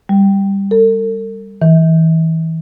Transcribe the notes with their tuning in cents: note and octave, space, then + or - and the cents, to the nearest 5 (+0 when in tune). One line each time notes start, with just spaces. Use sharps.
G3 +10
A4 +45
E3 -30